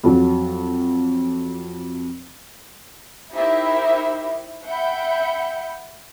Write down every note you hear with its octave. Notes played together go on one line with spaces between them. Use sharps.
F2 F#3
D#4 E4 G4 A#4 C5 E5
E5 F#5 G5 B5 G6 C#7